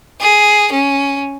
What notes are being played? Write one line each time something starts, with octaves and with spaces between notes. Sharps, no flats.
G#4
C#4